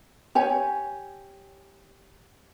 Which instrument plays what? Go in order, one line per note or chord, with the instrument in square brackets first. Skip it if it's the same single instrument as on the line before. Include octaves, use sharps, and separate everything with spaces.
[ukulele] G4 C#5 G#5